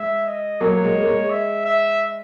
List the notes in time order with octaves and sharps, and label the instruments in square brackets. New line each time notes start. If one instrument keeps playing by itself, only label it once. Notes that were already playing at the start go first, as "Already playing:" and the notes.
Already playing: [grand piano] G#3 [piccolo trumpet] E5
[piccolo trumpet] D#5
[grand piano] F#3 A#3 [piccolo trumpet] C#5
[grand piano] G#3
A#3
G#3
[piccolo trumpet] E5
E5